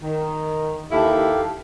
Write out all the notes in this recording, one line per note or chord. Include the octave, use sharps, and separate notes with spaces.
D#3
D#2 D#3 E4 G4 A4 F5